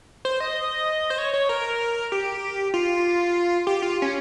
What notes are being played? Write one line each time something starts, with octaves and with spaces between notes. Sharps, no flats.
C5
D#5
C5
C#5
C#5
A#4
G4
F4
G4
F4
C#4